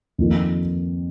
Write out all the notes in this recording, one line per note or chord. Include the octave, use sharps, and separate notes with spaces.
F2 D#3 A#3 F4